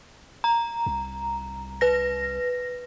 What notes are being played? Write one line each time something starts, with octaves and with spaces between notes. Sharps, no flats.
A#5
C2
B4 A#6